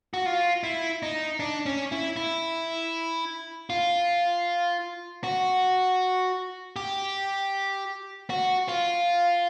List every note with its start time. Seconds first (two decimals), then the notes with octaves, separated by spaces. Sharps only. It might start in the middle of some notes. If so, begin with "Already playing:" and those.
0.14 F#4
0.26 F4
0.64 E4
1.03 D#4
1.40 D4
1.66 C#4
1.92 E4
2.16 E4
3.70 F4
5.24 F#4
6.76 G4
8.30 F#4
8.69 F4